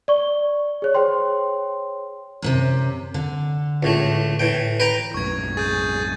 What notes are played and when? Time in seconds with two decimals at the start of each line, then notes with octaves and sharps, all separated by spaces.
0.08 D5 C#6 G7
0.82 G#4 C#5
0.94 G#4 C5 C#5 G5 C6
2.42 F#2 A2 C3
3.14 D3
3.83 C#2 A2 A3
4.39 A2 E3 G5
4.80 B4 G5 A#5
5.14 B1 F#2 A2 C#6 G#6
5.57 G#4 G6 A6